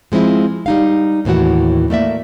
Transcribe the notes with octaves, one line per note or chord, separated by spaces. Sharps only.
F3 G#3 C4 E4 F4
G3 D#4 F5
D#2 A2 E3 F#4 F#5
A3 A#3 D5 E5